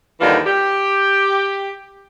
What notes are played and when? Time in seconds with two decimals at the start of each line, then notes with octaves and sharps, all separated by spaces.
0.20 D#2 D3 E3 G3 F4
0.47 G4